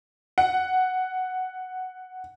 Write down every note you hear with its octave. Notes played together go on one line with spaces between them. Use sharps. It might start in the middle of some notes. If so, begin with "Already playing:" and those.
F#5